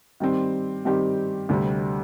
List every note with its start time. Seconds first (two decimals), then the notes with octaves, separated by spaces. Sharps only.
0.20 D#3 G3 C4 G4
0.85 D#3 G3 C4 G4
1.49 D2 C3 G3 C4